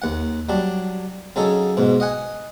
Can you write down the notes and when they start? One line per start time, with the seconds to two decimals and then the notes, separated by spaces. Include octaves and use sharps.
0.02 D#2 F#5
0.49 F#3 G3 D4
1.36 C#3 F#3 C#4 D#4 A4
1.77 G#2 B2
2.00 D#5 F#5 G#5